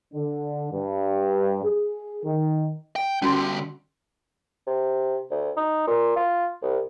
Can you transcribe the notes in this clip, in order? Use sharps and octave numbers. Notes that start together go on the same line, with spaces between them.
D3
G2
G#4
D#3
G5
D3 G3 C#4 F#4 C6
C3
D2
D#4
A#2
F4
C2